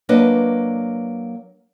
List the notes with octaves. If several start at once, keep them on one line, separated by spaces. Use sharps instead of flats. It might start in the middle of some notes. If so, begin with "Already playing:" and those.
F#3 A#3 D4 B4 D#5